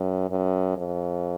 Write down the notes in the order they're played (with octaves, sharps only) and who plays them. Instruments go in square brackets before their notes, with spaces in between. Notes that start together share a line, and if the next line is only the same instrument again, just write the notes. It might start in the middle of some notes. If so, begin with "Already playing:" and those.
Already playing: [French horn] F#2
F#2
F2